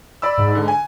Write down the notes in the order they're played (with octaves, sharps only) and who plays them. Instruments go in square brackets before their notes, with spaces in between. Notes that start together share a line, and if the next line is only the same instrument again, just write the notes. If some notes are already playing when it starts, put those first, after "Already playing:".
[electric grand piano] D5 B5 E6
[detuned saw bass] G#2
[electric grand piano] D3
G#5